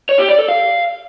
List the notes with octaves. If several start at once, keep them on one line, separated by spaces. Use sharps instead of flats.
C#5
G4
D5
A4
F5